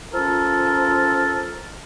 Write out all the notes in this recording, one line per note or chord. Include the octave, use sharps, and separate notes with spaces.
F3 C#4 F4 A4 A#4